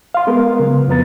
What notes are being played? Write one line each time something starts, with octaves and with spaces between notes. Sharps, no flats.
F5 C6
G#3 B3 A#4
C#3 F#3
F2 B3 B4 A#5 A6